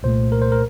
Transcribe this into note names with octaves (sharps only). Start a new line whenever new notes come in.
C2 A#2 A3 C5
A#4
C5
A#4